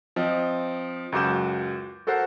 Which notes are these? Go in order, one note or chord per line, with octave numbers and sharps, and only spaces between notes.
F3 C4 D#5
C#2 F#2 F#4 D6 G6 E7
F#4 A4 A#4 C5 F#5